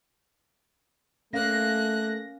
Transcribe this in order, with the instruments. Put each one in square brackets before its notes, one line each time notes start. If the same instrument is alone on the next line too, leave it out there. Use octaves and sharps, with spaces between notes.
[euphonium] A3 [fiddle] A#3 F#6 [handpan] C#4 F5 [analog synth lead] A#6